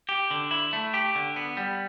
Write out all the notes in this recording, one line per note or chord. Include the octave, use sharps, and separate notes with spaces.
G4
D3
E4
A3
G4
D3
B3
G3